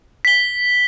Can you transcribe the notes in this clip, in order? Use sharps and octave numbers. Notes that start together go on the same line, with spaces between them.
B6 G7